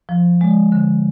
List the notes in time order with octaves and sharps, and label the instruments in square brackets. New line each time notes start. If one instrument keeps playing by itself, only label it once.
[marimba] F3
G#3
D3